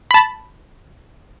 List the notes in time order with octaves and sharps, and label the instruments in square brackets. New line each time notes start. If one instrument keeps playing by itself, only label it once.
[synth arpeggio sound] A5 B5